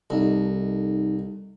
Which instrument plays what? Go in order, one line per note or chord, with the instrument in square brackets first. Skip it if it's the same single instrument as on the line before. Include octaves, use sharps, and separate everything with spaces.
[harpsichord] C2 [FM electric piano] D#4 A4